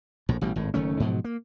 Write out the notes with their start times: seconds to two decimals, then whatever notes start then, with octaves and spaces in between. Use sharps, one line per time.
0.29 A#1 A2
0.41 A1 B2 G3
0.56 G#1 A2
0.74 F#1 D#3 A3 C#4
1.00 G#2 B2 F3 F#3
1.24 A#3